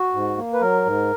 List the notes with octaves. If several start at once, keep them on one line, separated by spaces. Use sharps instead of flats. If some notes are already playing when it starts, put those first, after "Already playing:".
Already playing: F#4
G#2
A#3
B4
F#3 A#4
G#2